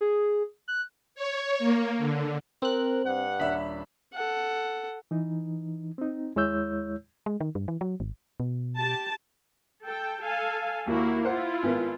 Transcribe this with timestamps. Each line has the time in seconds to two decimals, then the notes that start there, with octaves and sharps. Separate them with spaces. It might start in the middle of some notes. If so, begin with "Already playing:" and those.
0.01 G#4
0.68 F#6
1.15 C#5
1.59 A#3
1.98 D3
2.62 C4 A#4 F#6
3.05 G2 F#5
3.40 D#1 D4 E5 B5
4.14 A4 F#5
5.11 E3 D#4
5.98 C4 D#4
6.36 D#2 G#3 E4 C#5 E6 G6
7.26 G#3
7.41 D#3
7.55 G2
7.68 E3
7.81 F#3
8.00 G#1
8.40 B2
8.76 G4 A5
9.84 A4 G5
10.23 A4 F5 G#5
10.87 D#2 A#3 E4 F#4
11.25 E4 F4 C5 F#5
11.63 G#1 B3 A#4